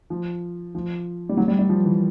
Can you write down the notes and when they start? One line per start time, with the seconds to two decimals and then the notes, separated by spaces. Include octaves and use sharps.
0.10 F3
0.75 F3
1.29 G3
1.37 F#3
1.48 G3
1.59 G3
1.69 F3
1.85 E3